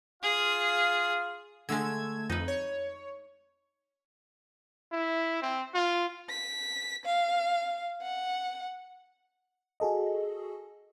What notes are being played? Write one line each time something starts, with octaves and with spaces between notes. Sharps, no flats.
F4 G#4 F5
D3 G#3 A3 E6 G#6
F2 D#4 B4
C#5
E4
C4
F4
B6
F5
F#5
F#4 G#4 A4 D#5